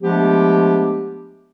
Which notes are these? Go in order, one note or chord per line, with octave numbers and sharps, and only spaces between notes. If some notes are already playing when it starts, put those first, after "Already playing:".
F3 G#3 A3 B3 D4 G4